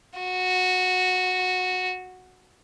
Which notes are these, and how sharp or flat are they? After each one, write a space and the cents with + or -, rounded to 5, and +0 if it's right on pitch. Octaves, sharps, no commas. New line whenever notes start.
F#4 -10